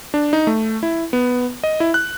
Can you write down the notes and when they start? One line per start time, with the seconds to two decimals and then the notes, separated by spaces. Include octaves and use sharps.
0.14 D4
0.33 D#4
0.47 A3
0.83 E4
1.13 B3
1.64 D#5
1.80 E4
1.94 F#6